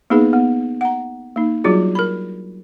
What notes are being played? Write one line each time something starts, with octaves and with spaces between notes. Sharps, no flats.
A#3 B3 D#4 G#4 B4
B3
F#5 A#5
A#3 D#4
F#3 G3 D4 F4 F#4 G#4
A#4 B5